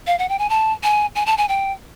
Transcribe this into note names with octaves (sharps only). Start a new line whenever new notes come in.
F5
F#5
G5
G#5
A5
G#5
G#5
A5
G#5
G5